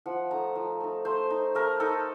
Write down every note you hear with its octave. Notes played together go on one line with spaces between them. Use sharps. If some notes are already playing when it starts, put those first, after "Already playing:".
F3 F#5
A3 D#4 A#5
F3
A3 D#4
A3 C5
D#4
A3 A#4
D#4 A4